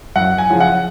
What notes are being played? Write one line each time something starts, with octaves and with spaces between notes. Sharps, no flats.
F#2 F#5
G#5
C#3 F3
F#5